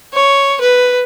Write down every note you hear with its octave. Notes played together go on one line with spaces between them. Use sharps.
C#5
B4